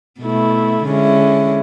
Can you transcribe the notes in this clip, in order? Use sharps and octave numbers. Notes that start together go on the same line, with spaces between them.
B2 A3 E4
D3 G#3 C#4 E4